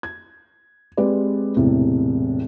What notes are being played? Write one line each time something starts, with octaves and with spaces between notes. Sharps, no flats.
G#6
G#3 C4 G4 B4 D5
E1 E2 A2 C3